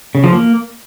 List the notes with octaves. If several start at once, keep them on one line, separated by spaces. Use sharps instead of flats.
C#3
F3
A#3